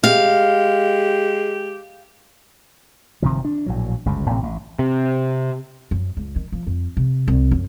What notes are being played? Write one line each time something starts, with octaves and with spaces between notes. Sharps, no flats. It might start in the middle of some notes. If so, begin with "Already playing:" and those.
G#3 G4 F5
G1 C3 D#3 F3
D4
A#1 A2 F#3
G1 C#2 F#2 C#3
A1 A2 C3 C4
A1
C3
F#2
C#2
D#3
F3
F2
C3
C2
F#2